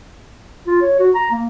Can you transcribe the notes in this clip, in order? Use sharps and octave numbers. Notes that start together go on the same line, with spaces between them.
F4
C#5
F#4
A#5
A#3